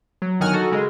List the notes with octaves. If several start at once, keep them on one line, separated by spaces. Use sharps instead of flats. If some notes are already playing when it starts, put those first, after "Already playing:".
F#3
G1 D#3 F#3 F#5 G#5 F6
D#4 F#4 A4
C#3 G#3 A#4 D#5